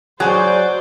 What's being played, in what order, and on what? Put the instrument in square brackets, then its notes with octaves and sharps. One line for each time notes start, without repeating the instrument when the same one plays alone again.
[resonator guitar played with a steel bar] F#3 [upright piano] G#4 G#5 [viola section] C5 D5